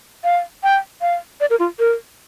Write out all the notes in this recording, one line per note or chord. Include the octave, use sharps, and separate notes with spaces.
F5
G5
F5
D5
A#4
F4
A#4